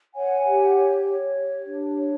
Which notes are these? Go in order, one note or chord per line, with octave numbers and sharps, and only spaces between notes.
C#5 F#5 G#5
G4
C#5
C#5
G4
D4
C#5